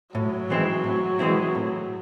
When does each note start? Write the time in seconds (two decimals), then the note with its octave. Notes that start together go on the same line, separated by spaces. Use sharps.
0.15 A2 F#3
0.50 E3 G#3 C4 E4
0.84 A2
1.19 E3 G#3 C4 E4
1.55 A2